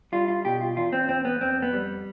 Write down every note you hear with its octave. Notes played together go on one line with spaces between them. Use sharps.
G3 F4
F4
B2 G4
F4
E2 F4
C4
E2 C4
B3
F2 C4
B3
G3